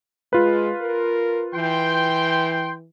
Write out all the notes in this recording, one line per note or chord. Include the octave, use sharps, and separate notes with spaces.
G#3 F4 B4
A#4
E3 G5 C6